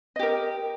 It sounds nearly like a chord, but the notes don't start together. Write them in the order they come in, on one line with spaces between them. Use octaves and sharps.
D#5 G4 A#4